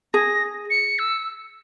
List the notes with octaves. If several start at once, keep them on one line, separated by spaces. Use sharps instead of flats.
G#4 A#6
C#7
E6